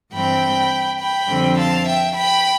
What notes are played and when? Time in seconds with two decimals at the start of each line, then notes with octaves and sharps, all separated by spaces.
0.13 G2 E3 G3 C4 G5 B5
1.00 G5 B5
1.29 F2 D3 G3 C4
1.57 F5 A5
1.87 E5 G5
2.16 G5 B5